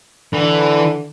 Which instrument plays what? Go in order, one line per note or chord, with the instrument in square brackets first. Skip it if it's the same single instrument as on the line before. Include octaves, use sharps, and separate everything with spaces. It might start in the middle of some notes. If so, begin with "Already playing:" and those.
[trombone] D3 [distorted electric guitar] E3 B4